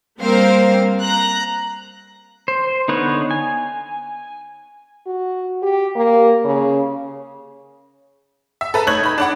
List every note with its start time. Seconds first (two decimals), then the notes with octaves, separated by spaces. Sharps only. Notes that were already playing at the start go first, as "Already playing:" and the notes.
0.21 G3 A#3 C4 A#4 C5 F5
1.01 A#5 F#6
2.48 C5
2.88 D3 B3 D#4 B4 C#5
3.31 G#5
5.07 F#4
5.63 G4
5.96 A#3
6.45 C#3
8.61 E5
8.74 A4 B4 A#5
8.87 A3 D#4 C#5 F#6 G#6 F#7
9.03 D#4 B5
9.18 D4 D5 F#5